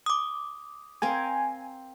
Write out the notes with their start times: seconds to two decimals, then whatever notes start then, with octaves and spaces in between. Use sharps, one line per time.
0.06 D6 D#6
1.02 C4 A#4 F5 G#5